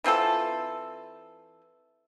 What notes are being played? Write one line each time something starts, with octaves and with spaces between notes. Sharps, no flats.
E3 C4 F4 A4